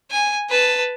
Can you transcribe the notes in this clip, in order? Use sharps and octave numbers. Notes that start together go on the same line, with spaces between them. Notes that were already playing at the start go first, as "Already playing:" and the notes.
G#5
B4 A5